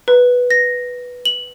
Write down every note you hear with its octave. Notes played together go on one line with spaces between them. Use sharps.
B4
A#6
F#7